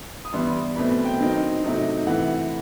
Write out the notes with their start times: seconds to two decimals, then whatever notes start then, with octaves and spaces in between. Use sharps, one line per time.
0.25 D#6
0.33 G2 E3 G3 B3 E4 C6
0.76 E2 B2 A3 C4 B5
1.05 G5
1.20 D#3 F#3 C4 D#4
1.64 C3 F#3 A3 D#4
2.07 C3 E3 A3 E4 F#5